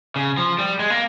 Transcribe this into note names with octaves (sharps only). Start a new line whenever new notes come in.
C#3
F3
G3
G#3
A#3